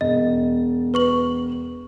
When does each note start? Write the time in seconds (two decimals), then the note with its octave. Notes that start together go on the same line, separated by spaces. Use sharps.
0.01 E1 D#5
0.94 B4 C#6 F#7